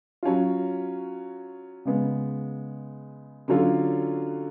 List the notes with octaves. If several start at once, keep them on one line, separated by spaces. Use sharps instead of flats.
F#3 C#4 F4
C#3 G#3 B3
D3 F#3 C#4 F4 A4